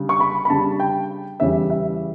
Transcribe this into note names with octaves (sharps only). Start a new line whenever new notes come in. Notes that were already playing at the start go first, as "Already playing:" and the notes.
Already playing: C#3 G3 D4
C#6
B5
B5
C#3 G3 D4 A5
G5
E2 C#3 E3 G3 C#4 E5
E5